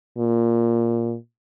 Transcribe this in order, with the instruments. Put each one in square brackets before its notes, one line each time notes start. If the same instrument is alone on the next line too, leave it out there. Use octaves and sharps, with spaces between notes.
[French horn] A#2